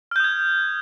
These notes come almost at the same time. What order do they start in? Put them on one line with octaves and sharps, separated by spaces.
F6 G6 D#6 G#6